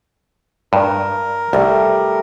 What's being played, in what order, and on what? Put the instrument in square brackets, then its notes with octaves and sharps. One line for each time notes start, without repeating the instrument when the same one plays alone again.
[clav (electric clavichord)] G2 [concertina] A#4
[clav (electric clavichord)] C2 [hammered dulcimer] G3 A3